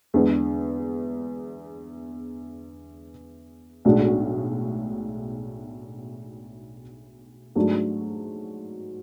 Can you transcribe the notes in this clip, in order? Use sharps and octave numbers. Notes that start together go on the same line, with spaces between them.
E2 D3 G#3 B3
B1 A2 G#3 D4 F#4
G#2 F#3 A3 D4